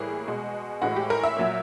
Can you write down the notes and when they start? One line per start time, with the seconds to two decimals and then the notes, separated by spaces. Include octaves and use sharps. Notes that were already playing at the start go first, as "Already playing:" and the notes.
Already playing: A2 E3 G3 A#3 G#4
0.28 B2 G#3
0.82 A2 E3 G#3 F#4
0.96 G4
1.10 A#4
1.23 E5
1.37 A#2 F#3 A#3